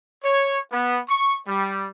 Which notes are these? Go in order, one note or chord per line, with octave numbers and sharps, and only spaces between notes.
C#5
B3
C#6
G3